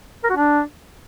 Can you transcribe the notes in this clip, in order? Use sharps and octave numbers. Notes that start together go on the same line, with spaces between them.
A#4
F#4
D4